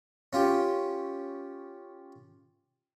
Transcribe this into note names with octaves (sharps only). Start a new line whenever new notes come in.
C#4 F4 G4